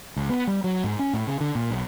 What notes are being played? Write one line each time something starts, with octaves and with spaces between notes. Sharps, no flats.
C#2
B3
G3
F#3
G#2
C#4
A2
C#3
D3
A#2
B1